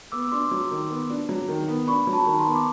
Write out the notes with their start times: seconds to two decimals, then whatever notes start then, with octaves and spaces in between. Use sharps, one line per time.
0.12 B3 D6 E6
0.32 D4 C6 D6
0.51 F#3
0.71 D#3
0.90 B3
1.10 D4
1.29 F#3
1.49 D#3
1.68 B3
1.87 D4 B5 C#6
2.07 F#3
2.13 A5 B5
2.26 D#3
2.39 A#5 C6
2.46 B3
2.55 D6